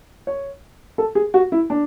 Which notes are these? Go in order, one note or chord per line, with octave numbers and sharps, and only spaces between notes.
C#5
A4
G#4
F#4
E4
D4